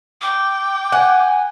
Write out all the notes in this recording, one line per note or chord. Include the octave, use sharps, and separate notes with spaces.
G5 D6
F#5 G#5